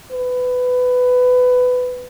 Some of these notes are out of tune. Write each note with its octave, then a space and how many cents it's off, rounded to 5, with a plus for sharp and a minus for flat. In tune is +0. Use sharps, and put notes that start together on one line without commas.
B4 +15